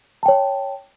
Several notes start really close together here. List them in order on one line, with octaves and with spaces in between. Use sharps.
A5 G5 C#5